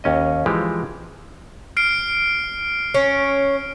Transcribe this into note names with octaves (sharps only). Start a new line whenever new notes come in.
D#2 C#4 D#5
E3 F3 G#3 G4
F6 C7 D7
C#4